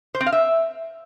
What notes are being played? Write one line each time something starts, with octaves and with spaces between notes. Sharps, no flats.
C5
C4
F5
E5